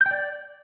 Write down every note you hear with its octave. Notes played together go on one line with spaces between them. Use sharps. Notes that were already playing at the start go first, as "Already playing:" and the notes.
G6
G5
D5